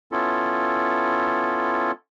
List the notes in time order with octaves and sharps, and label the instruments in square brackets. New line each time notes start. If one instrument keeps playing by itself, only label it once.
[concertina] B3 C#4 E4 F4 A4